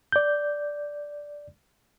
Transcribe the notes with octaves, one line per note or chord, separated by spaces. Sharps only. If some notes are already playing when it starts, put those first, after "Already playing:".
D5 G6